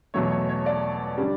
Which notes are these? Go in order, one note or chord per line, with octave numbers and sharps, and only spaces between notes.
E2 B2 F#3 A3 C#5
C#5
C#5
D5
D3 G3